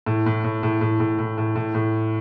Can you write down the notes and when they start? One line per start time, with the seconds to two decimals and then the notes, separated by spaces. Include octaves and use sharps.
0.06 A2
0.26 A2
0.44 A2
0.63 A2
0.81 A2
1.00 A2
1.19 A2
1.38 A2
1.56 A2
1.75 A2